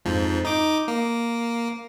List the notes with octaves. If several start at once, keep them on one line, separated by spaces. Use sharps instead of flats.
F2 G#2 F3
D#4 D6
A#3